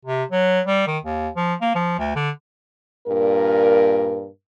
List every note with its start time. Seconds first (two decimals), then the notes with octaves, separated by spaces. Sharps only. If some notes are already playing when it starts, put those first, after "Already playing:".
0.05 C3
0.32 F#3
0.66 G3
0.87 D#3
1.04 D#2
1.36 F3
1.61 A#3
1.75 F3
1.99 D2
2.16 D3
3.07 G2 A#2 A#4